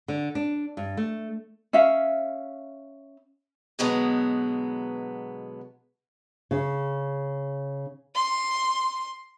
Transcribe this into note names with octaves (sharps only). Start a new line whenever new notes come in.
D3
D4
G2
A3
C#4 E5 F5
B2 D3 F#3 G#3 B3
C#3
C6